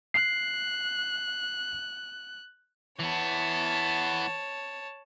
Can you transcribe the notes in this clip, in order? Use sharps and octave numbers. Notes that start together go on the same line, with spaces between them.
F#6 C7
E3 B3 C#5 A5